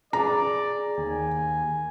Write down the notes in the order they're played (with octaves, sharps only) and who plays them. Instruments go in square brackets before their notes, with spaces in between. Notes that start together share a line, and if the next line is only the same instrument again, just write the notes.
[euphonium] G#4 [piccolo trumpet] D5 [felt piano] A#5
[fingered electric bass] D#2 [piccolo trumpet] G#5